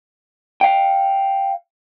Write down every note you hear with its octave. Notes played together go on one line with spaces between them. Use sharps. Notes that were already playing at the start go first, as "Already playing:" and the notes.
F5 G5